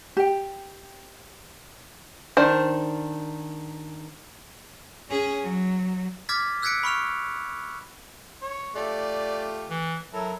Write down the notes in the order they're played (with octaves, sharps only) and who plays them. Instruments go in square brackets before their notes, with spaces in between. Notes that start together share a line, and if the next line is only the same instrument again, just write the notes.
[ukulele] G4 G5
[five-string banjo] D#3 D4 C5
[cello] C#4 G#4
F#3
[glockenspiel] D6 F6 G#6 A6 B6
E6 F#6 G#6 B6 C#7 D7
B5 C#6 F6 F7
[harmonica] C#5
[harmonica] A3 F4 G4 [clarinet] D5
[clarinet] E3
[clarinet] F#3 [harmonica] E4 A4 A#4